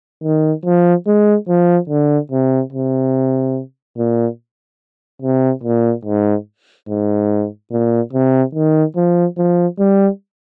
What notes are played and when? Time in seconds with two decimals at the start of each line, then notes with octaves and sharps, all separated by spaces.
0.23 D#3
0.65 F3
1.06 G#3
1.48 F3
1.89 D3
2.32 C3
2.72 C3
3.97 A#2
5.22 C3
5.63 A#2
6.05 G#2
6.88 G#2
7.71 A#2
8.13 C3
8.55 D#3
8.96 F3
9.38 F3
9.79 G3